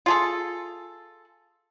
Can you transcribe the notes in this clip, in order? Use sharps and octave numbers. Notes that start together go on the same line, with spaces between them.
F4 G#4 A4